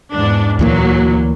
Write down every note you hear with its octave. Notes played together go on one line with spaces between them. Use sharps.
E2 G#2 D4
D2 A#2 E3 F#3 A#3